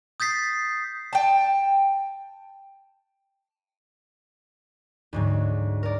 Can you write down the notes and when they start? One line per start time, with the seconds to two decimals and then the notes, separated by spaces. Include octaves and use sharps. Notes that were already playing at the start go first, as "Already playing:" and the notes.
0.20 D#6 G6 A6 B6 C7
1.13 G5 A5
5.13 D2 G#2 F#3
5.83 A#4 D5